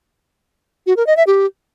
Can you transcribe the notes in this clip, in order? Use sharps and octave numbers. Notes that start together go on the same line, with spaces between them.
F#4
A#4
D#5
E5
G4